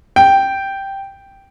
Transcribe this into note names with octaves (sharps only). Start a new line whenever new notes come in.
G5